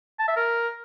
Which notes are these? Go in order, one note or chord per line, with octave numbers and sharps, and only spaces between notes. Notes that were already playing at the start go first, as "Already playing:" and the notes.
A5
E5
A#4